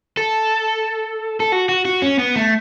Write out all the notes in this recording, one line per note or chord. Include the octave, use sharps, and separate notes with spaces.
A4
A4
F#4
F#4
F#4
C#4
B3
A3